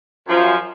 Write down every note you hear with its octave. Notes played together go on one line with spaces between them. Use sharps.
F#2 F3